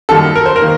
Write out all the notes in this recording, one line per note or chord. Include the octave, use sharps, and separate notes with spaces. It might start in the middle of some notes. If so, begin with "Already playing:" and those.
F#2 D#3 G3 A#3 A4
A#4
C5
A#4
D#3 A#3